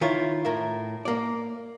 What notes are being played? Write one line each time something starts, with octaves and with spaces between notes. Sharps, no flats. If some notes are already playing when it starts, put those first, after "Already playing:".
D#3 E4 F4 C#5
A2 A#4 E5
A#3 D5